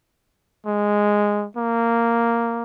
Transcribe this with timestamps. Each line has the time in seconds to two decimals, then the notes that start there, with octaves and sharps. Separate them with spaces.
0.66 G#3
1.57 A#3